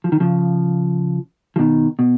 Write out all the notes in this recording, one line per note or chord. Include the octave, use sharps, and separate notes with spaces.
F3
D#3
C#3 F3
F3
B2 D#3
B2